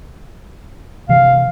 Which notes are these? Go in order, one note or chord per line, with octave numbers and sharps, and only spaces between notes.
C3 E3 F5